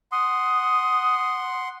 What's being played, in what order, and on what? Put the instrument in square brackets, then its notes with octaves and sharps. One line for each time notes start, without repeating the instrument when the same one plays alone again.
[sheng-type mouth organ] F#5 C6 [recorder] D#6